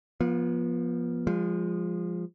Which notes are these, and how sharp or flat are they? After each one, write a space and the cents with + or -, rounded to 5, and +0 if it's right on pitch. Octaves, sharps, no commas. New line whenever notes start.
F3 +0 B3 -40
F3 +0 G#3 -30